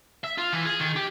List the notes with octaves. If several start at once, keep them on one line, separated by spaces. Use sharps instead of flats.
E5
F4
E3
G#4
D#3
G4